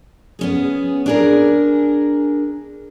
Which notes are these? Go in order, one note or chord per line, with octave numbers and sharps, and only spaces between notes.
B3 C#4 G#4
D4 G#4 A#4